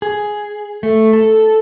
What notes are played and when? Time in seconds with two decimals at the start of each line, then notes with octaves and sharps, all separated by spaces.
0.02 G#4
0.83 A3
1.13 A4